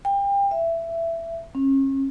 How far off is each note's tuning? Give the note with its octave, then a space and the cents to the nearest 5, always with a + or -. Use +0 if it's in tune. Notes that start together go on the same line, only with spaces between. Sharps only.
G5 +30
E5 +15
C#4 -35